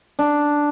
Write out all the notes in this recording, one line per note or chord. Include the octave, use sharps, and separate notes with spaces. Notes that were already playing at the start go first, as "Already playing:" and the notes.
D4